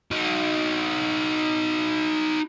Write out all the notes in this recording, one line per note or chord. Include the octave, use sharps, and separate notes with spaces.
D#4 F#4